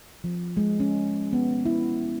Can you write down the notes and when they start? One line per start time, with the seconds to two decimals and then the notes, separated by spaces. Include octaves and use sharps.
0.24 F3
0.57 G#3
0.80 C#4
1.33 B3
1.66 E4